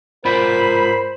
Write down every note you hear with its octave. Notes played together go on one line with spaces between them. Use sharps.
G#2 F4 A#4 C5 D5 B5